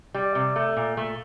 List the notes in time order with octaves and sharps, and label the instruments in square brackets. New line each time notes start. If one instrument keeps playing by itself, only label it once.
[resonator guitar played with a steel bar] G3
C3
A3
A#2
A3